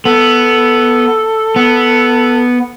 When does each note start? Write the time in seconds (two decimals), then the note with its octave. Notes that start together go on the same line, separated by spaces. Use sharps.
0.05 B3 A4
1.56 B3